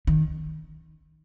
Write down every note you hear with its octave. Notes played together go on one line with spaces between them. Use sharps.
D#3